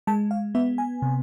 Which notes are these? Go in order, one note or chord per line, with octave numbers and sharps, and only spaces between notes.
G#3 A5
F5
B3 E5
G#5
C3